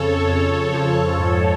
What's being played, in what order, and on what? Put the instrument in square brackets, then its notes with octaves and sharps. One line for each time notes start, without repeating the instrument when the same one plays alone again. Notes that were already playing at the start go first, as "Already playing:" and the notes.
Already playing: [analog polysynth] F2 C#3 A4 C#5
F2
F3
G#2